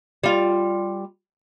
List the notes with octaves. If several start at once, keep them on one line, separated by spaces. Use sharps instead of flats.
G3 F4